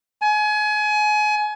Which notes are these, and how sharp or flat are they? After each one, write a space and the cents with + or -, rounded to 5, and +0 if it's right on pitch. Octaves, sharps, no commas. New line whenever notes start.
G#5 +30